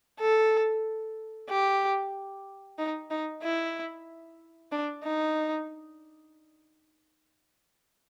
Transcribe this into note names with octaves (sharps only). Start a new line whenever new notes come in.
A4
G4
D#4
D#4
E4
D4
D#4